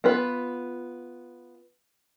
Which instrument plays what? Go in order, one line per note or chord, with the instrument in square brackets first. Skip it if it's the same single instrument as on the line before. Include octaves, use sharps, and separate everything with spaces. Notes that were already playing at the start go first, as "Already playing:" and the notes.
[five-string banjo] B3 F4 B4